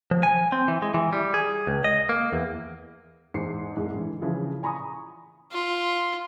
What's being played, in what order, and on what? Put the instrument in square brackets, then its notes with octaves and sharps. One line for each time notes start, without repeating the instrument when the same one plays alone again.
[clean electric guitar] F3
G#5
C4
E3
G#3
E3
G3
G#4
C#2
D#5
A#3
E2
[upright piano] E2 G#2 E4 C5 C7 C#7
C2 G#2
G2 D3 E3
C#3 E3 F3 E4 F4
G#5 A#5 B5 C#6 D#6
[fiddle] F4